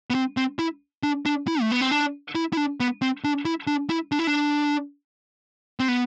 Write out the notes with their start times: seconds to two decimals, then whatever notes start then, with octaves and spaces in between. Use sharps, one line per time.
0.10 B3
0.15 C4
0.37 C4
0.59 E4
1.03 D4
1.26 D4
1.48 E4
1.61 A3
1.71 B3
1.81 C4
1.91 D4
2.35 E4
2.53 E4
2.57 D4
2.80 B3
3.02 C4
3.24 D4
3.45 E4
3.67 D4
3.89 E4
4.12 D4
4.19 E4
4.27 D4
5.80 C4
5.88 B3